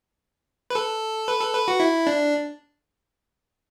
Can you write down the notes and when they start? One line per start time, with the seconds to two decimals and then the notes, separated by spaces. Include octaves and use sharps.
0.70 B4
0.75 A4
1.28 B4
1.41 A4
1.54 B4
1.68 F#4
1.80 E4
2.07 D4